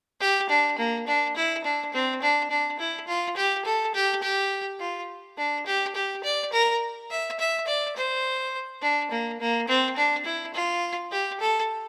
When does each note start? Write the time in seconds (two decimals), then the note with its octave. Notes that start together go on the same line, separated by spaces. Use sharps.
0.20 G4
0.49 D4
0.78 A#3
1.07 D4
1.36 E4
1.64 D4
1.93 C4
2.22 D4
2.50 D4
2.79 E4
3.08 F4
3.36 G4
3.65 A4
3.94 G4
4.22 G4
4.80 F4
5.37 D4
5.66 G4
5.95 G4
6.24 D5
6.52 A#4
7.10 E5
7.39 E5
7.67 D5
7.96 C5
8.82 D4
9.11 A#3
9.40 A#3
9.68 C4
9.96 D4
10.25 E4
10.54 F4
11.12 G4
11.40 A4